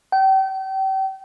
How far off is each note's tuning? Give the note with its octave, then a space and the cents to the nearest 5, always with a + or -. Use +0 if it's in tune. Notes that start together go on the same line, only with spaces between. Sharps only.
G5 -35